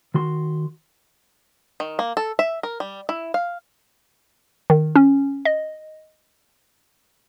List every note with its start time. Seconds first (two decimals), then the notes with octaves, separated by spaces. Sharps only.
0.14 D#3 F#4 C6
1.80 D#3
1.99 A#3
2.17 A4
2.39 E5
2.63 A#4
2.80 G3
3.09 E4
3.34 F5
4.70 D#3
4.96 C#4
5.45 D#5